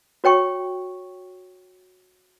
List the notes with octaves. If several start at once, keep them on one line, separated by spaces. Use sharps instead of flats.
F#4 C#5 G5 C#6